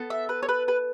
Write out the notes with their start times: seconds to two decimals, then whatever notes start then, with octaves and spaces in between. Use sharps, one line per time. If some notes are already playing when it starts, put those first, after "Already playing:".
Already playing: B3 A4
0.10 E5
0.29 B4
0.43 C#5
0.49 B4
0.68 B4